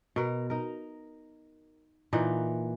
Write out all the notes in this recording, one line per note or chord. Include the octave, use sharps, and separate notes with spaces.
B2 A#4
D#4 A#4
A#2 E3 D#4 F#5